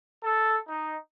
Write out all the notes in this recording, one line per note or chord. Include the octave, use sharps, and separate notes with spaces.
A4
D#4